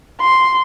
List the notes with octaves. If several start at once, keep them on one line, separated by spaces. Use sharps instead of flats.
C6